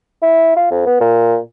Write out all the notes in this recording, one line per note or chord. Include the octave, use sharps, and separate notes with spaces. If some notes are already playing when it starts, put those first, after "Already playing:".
E4
F4
F2
B3
A#2